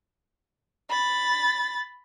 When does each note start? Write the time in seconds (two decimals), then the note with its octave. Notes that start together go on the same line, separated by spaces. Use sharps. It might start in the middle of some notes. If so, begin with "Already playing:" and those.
0.90 B5 A6